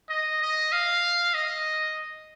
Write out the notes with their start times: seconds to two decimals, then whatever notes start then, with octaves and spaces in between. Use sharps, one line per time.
0.09 D#5
0.41 D#5
0.72 F5
1.34 D#5